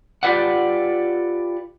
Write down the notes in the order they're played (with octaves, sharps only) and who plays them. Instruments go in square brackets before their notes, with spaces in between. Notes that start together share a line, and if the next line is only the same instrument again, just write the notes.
[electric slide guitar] F4 G4 B4 D5 F#5